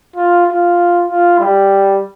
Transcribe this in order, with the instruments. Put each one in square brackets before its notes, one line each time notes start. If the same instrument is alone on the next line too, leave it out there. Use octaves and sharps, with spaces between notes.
[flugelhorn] F4
F4
F4
G3